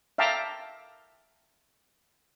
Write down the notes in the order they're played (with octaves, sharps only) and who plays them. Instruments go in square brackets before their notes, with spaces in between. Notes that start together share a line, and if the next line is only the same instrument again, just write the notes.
[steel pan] E5 F5 G5 A5 A#5 D6